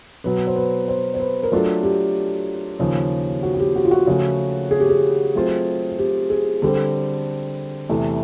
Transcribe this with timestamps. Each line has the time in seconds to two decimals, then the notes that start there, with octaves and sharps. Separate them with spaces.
0.24 B2 F#3 B3 B4
0.47 C5
0.56 B4
0.88 C5
1.14 C5
1.20 B4
1.43 A#4
1.52 F#3 A3 D4 F4 A4
1.83 G4
2.79 D#2 C#3 F3
3.43 F#4
3.54 F#4
3.59 G4
3.76 F#4
3.85 F4
3.91 F#4
4.07 C#3 F3 A3
4.71 G#4
4.80 G4
4.89 G#4
5.35 F#3 A3 C4 F4
5.99 G4
6.30 G#4
6.62 D3 G3 C4 A4
7.89 E2 C3 E3 A3